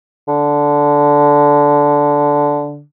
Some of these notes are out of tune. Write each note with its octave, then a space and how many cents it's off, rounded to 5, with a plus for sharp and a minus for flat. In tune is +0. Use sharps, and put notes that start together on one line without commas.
D3 -10